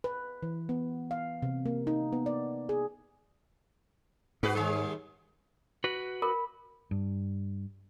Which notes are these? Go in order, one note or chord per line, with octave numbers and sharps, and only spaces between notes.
B4
E3
B3
F5
C3
A#3
D#4
B3
D5
G#4
G#2 F#4 G#4 B4
D#2 G3 G#4
F#4 B4
A#4 B5
G2